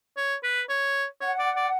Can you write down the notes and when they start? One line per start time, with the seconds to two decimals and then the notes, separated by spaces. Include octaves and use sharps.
0.17 C#5
0.43 B4
0.69 C#5
1.21 C#5 F#5
1.39 D5
1.56 D5